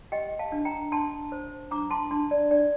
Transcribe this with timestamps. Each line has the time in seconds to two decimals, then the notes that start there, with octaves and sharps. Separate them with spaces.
0.12 G4 D#5 G5
0.39 F5 A5
0.52 D4
0.65 G5 A#5
0.92 D4 A5 C6
1.32 C5
1.71 D4 A#5 D6
1.90 A5 C6
2.11 D4 A5 C6
2.31 D5
2.51 D4 D5